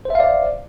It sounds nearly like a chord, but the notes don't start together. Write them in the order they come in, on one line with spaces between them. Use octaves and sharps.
C5 E5 F5 D5